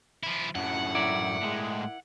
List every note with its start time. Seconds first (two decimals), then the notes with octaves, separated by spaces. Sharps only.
0.23 F3 E4
0.55 F#2 A2 F#5
0.95 E4 A#4 D5
1.42 A2 G#3